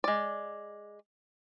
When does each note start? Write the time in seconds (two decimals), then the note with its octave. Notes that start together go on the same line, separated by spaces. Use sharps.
0.04 G#3 D5